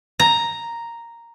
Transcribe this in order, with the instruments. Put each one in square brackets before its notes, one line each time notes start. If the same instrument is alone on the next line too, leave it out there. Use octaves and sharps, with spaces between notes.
[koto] A#5